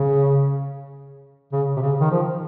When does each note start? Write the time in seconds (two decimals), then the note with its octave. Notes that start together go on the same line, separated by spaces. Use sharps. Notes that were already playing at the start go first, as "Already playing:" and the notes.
Already playing: C#3
1.53 C#3
1.77 C3
1.82 C#3
2.00 D#3
2.11 F3